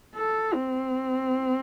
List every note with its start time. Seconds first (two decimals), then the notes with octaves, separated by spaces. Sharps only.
0.15 A4
0.54 C4